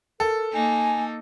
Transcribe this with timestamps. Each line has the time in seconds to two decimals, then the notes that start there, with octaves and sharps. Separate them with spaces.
0.20 A4 A#4
0.53 A#3 D#4 G#5